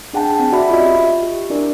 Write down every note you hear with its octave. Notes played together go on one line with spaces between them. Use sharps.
D4 G#4 F#5 G5 A5
C4
F#4 D5 E5 B5
C#4 F4 G4 D#5 E5
G4
D4 E4 A#4 D5